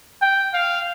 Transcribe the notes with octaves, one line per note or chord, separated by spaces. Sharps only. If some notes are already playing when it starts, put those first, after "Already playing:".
G5
F5